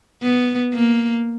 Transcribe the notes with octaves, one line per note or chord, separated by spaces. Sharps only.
B3
A#3